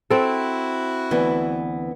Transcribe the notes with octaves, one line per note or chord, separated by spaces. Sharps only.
C4 E4 F#4 A4
D2 E3 B3